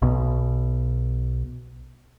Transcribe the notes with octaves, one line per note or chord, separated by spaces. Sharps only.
B1 B2